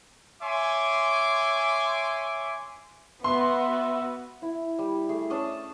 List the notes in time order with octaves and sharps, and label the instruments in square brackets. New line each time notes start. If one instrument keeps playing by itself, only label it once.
[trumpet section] C#5 E5 G#5 C6 D6
[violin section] B3 F#4 [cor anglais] E5 [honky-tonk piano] C6
[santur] E4
G3
A3 G#4
C#4 D4 A5 D#6